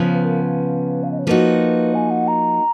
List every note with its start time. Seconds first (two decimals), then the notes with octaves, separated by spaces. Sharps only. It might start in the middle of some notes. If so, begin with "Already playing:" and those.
Already playing: C#3 F3 B3
0.13 B4
0.25 A#4
0.41 B4
1.03 F5
1.12 D#5
1.19 C#5
1.26 F3 A#3 D#4 F#4 B4
1.94 G#5
2.10 F#5
2.28 A#5